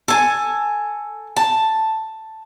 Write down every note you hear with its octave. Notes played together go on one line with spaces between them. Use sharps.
A4 G#5
A5